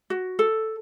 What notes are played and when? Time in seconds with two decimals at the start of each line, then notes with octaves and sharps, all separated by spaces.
0.10 F#4
0.39 A4